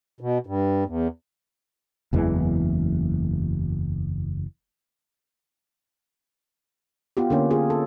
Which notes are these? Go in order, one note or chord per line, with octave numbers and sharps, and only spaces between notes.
B2
G2
E2
F#1 E2 E3 G#3
B3 F4 G4
D3 A#3 C#4
F4 G#4
A4